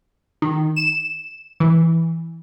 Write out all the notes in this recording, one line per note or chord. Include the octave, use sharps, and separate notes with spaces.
D#3
E7
E3